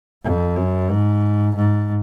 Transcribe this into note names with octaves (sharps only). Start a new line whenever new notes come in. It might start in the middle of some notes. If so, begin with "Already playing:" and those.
F2
F#2
G#2
G#2